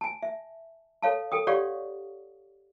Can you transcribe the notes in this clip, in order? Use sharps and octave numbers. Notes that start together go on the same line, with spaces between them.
G#5 A5
E5
A4 C#5 F5 A5
A4 G5 D#6
G4 C#5 D5 F5 F#5 C#6